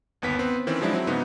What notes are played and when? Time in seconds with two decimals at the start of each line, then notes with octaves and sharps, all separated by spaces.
0.22 G1 D#2 B3 B6
0.39 B3 C4 B4
0.67 D#3 E3 C4 C#4
0.81 F3 F#3 G#3 D4 E4
0.93 F#3 C4 E4
1.07 G#2 C#3 B3 D#4 F#4